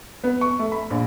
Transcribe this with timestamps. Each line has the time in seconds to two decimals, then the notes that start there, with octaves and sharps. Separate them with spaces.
0.24 B3
0.41 C#6
0.59 A3
0.72 B5
0.91 A#1